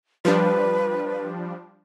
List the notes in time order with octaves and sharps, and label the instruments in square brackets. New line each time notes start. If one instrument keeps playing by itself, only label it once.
[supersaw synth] F3 G3 D4 [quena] B4